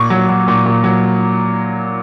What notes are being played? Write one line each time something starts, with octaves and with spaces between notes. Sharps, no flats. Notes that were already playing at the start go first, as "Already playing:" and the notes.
Already playing: A#2 C#6
F#3
F#3
A#2
A#2
F#3